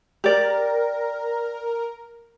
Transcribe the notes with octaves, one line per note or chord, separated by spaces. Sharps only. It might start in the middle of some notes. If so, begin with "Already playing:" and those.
G4 A#4 D5